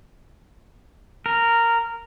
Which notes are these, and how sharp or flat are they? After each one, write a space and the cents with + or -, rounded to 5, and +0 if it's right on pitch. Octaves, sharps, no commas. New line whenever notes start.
A#4 -10